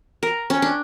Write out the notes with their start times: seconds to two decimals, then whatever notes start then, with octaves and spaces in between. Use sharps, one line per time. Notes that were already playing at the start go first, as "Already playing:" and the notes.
0.23 A#4
0.50 C#4
0.62 D4